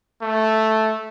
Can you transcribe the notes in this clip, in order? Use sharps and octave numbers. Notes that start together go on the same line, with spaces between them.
A3